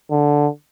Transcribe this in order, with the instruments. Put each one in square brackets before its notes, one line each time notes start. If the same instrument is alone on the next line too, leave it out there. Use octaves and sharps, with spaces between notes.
[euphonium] D3